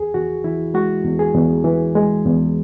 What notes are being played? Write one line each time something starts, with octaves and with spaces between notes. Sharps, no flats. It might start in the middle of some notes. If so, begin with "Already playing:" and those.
Already playing: E2 G#4
E2 F#4
E3 E4
G#3 F#4
E2
G#4
E2
E3
G#3
E2